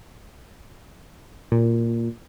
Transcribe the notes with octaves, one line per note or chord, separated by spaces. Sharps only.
A#2